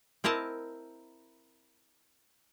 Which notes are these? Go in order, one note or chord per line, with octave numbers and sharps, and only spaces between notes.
C4 E4 A#4 D#5 A5